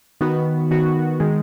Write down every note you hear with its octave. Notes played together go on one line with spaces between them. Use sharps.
D#3 B3 F#4
D#3 B3 F#4
D#3 G#3